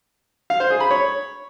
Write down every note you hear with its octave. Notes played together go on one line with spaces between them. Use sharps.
F5
C5
G#4
B5
C#5